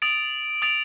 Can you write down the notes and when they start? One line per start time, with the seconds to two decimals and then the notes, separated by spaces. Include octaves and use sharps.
0.02 D#6 A6 D7 F7
0.62 D#6 A6 D7 F7